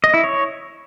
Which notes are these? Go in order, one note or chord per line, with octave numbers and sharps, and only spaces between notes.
D#5
E4
C#5